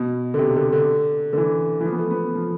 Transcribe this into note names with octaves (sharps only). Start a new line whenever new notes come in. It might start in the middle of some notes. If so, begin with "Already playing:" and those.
Already playing: B2
D3
C3
D3
D3
D3
E3
E3
F3
B3
A3
B3
F3